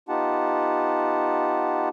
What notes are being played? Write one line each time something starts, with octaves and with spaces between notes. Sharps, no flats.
B3 D#4 F4 G4 F#5 A5